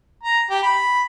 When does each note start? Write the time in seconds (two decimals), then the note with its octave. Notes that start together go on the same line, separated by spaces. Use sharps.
0.23 A#5
0.50 G4
0.63 B5